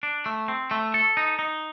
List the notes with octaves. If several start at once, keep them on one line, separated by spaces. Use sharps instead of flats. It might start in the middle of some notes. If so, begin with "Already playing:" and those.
D4
A3
C4
A3
A4
D#4
D#4